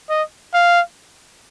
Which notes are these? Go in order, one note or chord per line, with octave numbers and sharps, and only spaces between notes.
D#5
F5